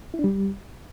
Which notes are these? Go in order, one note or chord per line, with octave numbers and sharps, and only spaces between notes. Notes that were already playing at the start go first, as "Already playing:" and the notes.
E4
D4
G3